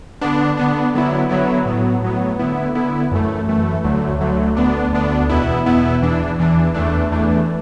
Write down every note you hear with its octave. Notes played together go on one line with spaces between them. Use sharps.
D3 B3 D4
D3 B3 D4
D3 F#3 B3 E4
D3 F#3 B3 E4
A2 F#3 B3
A2 F#3 B3
D3 B3 E4
D3 B3 E4
F#2 E3 A3
F#2 E3 A3
D2 D3 F#3 A3
D2 D3 F#3 A3
D2 D3 B3 D4
D2 D3 B3 D4
E2 B2 B3 E4
E2 B2 B3 E4
E2 E3 D4
E2 E3 D4
E2 E3 A3 D4
E2 E3 A3 D4